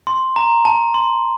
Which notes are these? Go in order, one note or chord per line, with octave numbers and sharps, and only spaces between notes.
C6
A#5
A5
C6